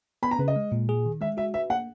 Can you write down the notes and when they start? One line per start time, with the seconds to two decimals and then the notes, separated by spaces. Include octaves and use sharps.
0.23 B3 B5
0.31 A#5
0.39 C#3 B4
0.48 D#5
0.56 G#3
0.72 A#2
0.89 G#4
1.06 D#3
1.21 G#3 E5
1.37 F#4 E5
1.54 B4 E5
1.70 A#3 F#5